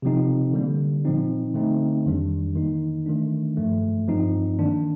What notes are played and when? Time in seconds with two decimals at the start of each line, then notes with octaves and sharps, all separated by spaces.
0.02 C3 F3 C4 D#4
0.53 D3 G3 A#3
1.05 A#2 F3 C4 D#4
1.54 D3 A3 C4 D#4
2.05 F2 D#3 G3 D4
2.56 D#3 A#3 D#4
3.06 D#3 A3 D4
3.57 G2 F3 A3
4.08 G2 F3 C4 D#4
4.59 D#3 A#3 D4